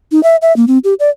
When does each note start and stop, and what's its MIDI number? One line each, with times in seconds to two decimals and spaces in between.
0.12 0.23 63
0.23 0.36 76
0.42 0.55 76
0.56 0.65 58
0.68 0.78 60
0.84 0.94 67
1.00 1.10 74